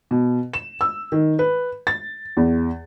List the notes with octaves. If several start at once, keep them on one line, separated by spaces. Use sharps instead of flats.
B2
E7
E6
D#3
B4
A6
E2